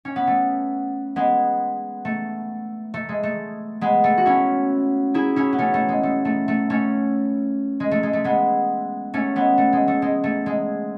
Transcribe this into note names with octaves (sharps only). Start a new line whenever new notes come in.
C#4
B3
A3
G#3 B3
A3
A3
G#3
A3
G#3 B3
A3
F#4
C#4 E4
E4 G#4
C#4 E4
B3
A3 C#4
A3
G#3
A3
A3
A3
A3 C#4
G#3
A3
G#3
A3
G#3 B3
A3 C#4
G#3 B3
A3
G#3
A3
G#3
A3
G#3